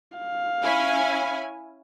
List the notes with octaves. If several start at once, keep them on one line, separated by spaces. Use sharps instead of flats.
F5
C#4 E4 G#5